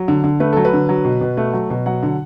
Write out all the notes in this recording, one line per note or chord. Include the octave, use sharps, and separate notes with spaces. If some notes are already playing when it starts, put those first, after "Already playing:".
Already playing: F#3
D3
D3
A3 B4
F#3 A4
B4
D3
F#3
B2
B2
A3
F#3
B2
F#3 F#5
D3